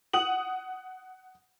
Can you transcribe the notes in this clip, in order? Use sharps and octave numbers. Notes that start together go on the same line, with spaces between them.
F#5 D#6 F#7